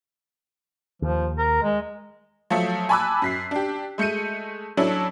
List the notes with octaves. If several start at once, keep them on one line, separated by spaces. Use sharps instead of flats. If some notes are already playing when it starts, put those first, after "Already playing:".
D#2 F3
A#4
G#3
F3 F#3 A3
G#5 A5 B5 D6 E6 F#6
F#2 B6 C7
D4 G4
G#3 A3 G6 C#7 D#7
F#3 C#4 D4 E4 A4